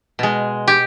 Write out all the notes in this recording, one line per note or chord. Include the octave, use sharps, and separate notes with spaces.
B2 G#3
G4